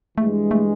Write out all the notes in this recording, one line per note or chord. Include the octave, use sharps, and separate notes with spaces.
G2 E3 G#3 A3
A3